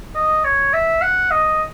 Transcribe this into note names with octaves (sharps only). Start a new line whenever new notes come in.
D#5
C#5
E5
F#5
D#5